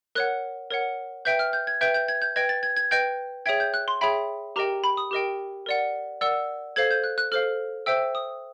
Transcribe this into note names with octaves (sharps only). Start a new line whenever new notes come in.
A#4 C#5 F#5 F#6
A#4 C#5 F#5
B4 E5 G5 G6
F6
G6
G#6
B4 E5 G5 G6
G6
G#6
G6
B4 D#5 G5 G#6
A6
G#6
G#6
B4 D#5 G5 G6
G#4 C#5 E5 G5 G#6
G6
F#6
C6
G#4 C#5 E5 G5 B5
G4 A#4 D#5 G5 A#5
B5
D#6
G4 A#4 D#5 G5
A#4 D5 F#5
A#4 D5 F#5 E6
A4 C5 F5 G#6
G6
F#6
F#6
A4 C5 F5 F6
C5 E5 G5 E6
D#6